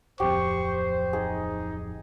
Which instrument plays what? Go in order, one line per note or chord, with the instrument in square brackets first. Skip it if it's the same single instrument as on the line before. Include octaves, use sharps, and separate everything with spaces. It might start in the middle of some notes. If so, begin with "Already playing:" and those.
[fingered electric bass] D1 F2 C4 [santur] G4 [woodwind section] C5 [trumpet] C#6
[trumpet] D#4 [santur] G#4